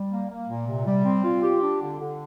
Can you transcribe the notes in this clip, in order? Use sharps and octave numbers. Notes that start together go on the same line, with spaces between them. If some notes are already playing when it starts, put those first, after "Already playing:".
Already playing: G3
A#3
A#3
A#2
C3
G3
C4
F4
G4
D4
D3
D3